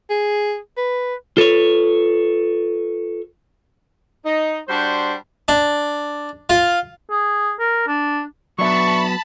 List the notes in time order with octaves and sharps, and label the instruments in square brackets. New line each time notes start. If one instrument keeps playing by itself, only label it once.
[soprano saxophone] G#4
B4
[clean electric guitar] F4 A4 B4 C#5
[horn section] D#4
G3 D4 F#4 C5
[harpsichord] D4
F4
[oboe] G#4
A#4
D4
[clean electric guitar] F#3 B3 [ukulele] D4 B4 E5 [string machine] A5 B5 [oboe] C#6